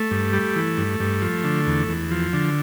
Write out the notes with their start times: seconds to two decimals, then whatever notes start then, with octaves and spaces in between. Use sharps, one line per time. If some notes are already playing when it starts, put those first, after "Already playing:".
Already playing: A3
0.11 G2
0.33 G3
0.56 E3
0.77 G2
1.00 G2
1.22 F3
1.44 D3
1.67 E2
1.89 E2
2.11 F3
2.33 D3